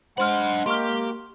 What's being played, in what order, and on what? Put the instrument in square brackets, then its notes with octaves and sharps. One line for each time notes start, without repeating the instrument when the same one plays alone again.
[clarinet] G#3 [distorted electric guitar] D4 B5 [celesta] C5 C6 F6 [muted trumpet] F#5
[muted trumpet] A#3 [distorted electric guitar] G4 [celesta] C6 C#6 F6